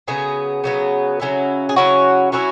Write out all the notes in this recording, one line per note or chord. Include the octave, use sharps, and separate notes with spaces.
C#3 F#3 B3 G#4
C#3 F#3 B3
C#3 F#3 C#4 E4
G#4
C#3 F#3 C#4 E4 F#4
F#3 C#4 E4 F#4